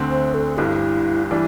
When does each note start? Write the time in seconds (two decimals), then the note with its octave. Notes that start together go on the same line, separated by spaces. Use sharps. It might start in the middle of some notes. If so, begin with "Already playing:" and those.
Already playing: D2 D3 C4
0.10 C5
0.34 A4
0.58 G1 G2 G3 E4
1.31 E3 G3 D4 E4